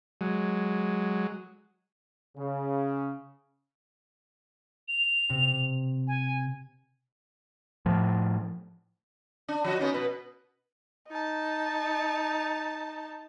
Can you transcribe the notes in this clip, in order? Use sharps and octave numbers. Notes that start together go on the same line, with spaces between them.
F#3 G#3
C#3
F7
C3
G#5
A2 F3
D4
F3 F#4 D#5
B3 C#4 D#4
B2 B4
D#4 A5